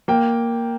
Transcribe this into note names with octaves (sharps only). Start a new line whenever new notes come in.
A#3 G5